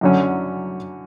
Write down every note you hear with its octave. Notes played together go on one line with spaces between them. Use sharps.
F#2 D3 F#3 C#4